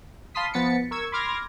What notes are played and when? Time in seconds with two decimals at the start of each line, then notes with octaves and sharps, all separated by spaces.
0.35 F5 A5 B5 C6 D#6 B6
0.53 F3 B3 A6 B6 C#7
0.91 A#4 C#6 E6 G#6
1.12 B5 C6 D6 F6 G#6 A#6